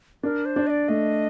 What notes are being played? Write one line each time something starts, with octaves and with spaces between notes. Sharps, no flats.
D4 A#4
C5
D4
D#5
D5
A3 D#5